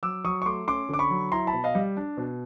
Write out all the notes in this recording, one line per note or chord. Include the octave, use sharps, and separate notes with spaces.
F#3 D6 E6
F#3 C#6 D#6
C#6
A3 C6 D6
C#4 C6 D6
D3 D6
B5 C#6
F#3
E4 A#5 C6
A5 B5
B2
D#5 F5
G3
D4
B2